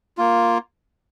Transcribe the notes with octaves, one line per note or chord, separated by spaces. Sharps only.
A#3 F4